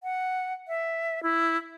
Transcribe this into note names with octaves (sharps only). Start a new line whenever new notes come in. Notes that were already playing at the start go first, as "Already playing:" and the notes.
F#5
E5
E4